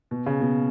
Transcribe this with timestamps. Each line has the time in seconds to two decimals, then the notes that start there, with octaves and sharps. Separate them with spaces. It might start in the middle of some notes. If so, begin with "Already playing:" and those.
0.11 B2
0.26 C#3
0.41 B2